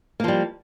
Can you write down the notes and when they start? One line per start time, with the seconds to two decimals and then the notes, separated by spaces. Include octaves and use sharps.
0.20 A#3
0.24 F3
0.28 G3